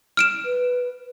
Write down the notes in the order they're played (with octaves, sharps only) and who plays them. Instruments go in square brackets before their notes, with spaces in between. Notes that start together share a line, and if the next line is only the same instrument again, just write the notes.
[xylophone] F6 D7 E7
[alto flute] B4